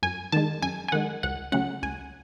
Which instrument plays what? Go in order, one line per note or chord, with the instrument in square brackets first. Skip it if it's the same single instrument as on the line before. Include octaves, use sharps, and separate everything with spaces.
[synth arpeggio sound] F#2 G#5
D#3 G#3 A5
F#2 G#5
G#5
D#3 G#3 F#5
C#2 F#5
C#3 F#3 A3 C#4 F#5
C#2 G#5